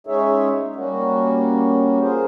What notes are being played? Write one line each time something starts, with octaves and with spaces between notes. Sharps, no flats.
G#3 C#4 D#4 G#4 C#5 E5
G3 A#3 C#4 F#4
F4 G#4 A#4 C5